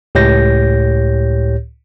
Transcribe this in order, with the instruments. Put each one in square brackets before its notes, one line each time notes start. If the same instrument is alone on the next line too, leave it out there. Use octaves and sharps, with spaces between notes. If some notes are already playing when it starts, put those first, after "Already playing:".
[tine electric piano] C#2 A2 G4 C#5 G6 A#6